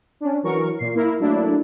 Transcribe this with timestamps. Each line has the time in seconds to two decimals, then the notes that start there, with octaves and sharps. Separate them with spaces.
0.21 C#4 D4
0.43 E3 F#3 A#4 C#6
0.79 A#2 C7
0.95 A#3 E4 A#4
1.20 F#3 A3 A#3 D4 E4